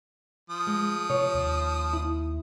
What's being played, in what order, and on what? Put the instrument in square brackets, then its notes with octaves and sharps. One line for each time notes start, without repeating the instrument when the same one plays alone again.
[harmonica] F3 D#6
[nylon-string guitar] G#3
[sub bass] C3 [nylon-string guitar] C#5
[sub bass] D#2
[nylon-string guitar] E4